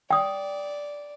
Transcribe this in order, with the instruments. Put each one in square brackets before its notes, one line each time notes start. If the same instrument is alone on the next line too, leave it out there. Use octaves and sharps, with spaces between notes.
[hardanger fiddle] D5 [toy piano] G5 D#6